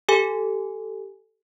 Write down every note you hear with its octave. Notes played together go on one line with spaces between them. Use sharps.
G4 A4 G#5